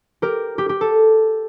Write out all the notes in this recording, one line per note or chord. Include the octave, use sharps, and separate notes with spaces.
G4 A#4
G4
G4
A4